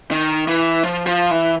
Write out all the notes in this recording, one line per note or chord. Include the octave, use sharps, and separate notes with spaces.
D#3
E3
F3
F3
E3